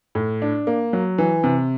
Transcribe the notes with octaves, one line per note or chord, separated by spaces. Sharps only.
A2
D4
A#3
F#3
E3
C3